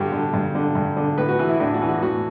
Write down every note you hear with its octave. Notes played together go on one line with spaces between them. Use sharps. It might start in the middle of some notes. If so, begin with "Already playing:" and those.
Already playing: G2 D3 F#4 G4
D3
G2
D3
G2
D3
A2 B4
F#4
E3
E4
A2 D4
F#4
E3
F#4
A2 F#4